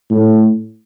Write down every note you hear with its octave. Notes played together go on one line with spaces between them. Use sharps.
A2